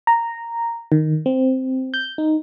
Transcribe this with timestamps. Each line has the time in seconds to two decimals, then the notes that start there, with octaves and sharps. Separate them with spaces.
0.07 A#5
0.92 D#3
1.26 C4
1.94 G6
2.18 D#4